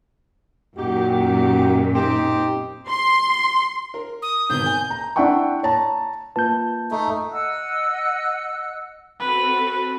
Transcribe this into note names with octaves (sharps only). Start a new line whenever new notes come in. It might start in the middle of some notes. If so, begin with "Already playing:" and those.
F#2 A#2 D#4 F#4 G4
C4 D#4 G4
C6
A#4
D#6
G#1 B2 G6
G#5
A#5
D4 E4 E5 F#5 G5 C#6
C#5 A5 A#5
A#3 F4 B4 A5 G6
A3 D#4
D#5 F#5 E6 F#6
C4 F#4 A4 B4